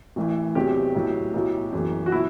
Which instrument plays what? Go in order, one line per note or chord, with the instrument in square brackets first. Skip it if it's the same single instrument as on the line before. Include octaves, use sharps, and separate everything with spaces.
[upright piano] A1 A2 E3
E2 C3 F#3 G4
B1 A2 F#3
B1 A2 F#3
F#1 F#2 E3
F#4
B2 F#3 E4